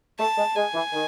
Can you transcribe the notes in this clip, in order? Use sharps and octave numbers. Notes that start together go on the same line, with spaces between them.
A3 A5
G#3
G#3 G#5
E3
D#3